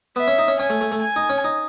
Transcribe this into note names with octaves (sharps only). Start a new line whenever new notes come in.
B3 E5
C#4
D#4
C#4
C#4 G#5
A3
A3
A3
G#5
D#4
C#4
D#4